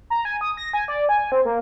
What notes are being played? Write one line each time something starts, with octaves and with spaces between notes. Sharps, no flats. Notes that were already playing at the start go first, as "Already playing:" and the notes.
A#5
G#5
D#6
A#6
G#5
D5
G#5
C4
A#3